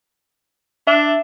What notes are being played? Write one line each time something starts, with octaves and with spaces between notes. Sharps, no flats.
D4 E5